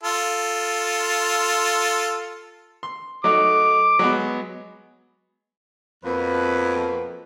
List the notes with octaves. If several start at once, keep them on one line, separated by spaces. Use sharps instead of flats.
F4 A4
C6
F#3 A3 D#4 D6
F#3 G#3 B3
F2 B2 A#3 B4